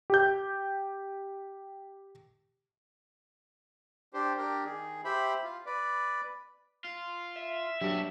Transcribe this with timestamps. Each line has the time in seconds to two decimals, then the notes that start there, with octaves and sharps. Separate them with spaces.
0.10 G4 G6
4.14 D4 G4 C5
4.37 D4 G4 A#4
4.65 D#3 G#4
5.05 G4 C5 E5 B5
5.44 F4
5.66 B4 D5
6.85 F4
7.36 E5
7.81 G2 F#3 D4 E4 G4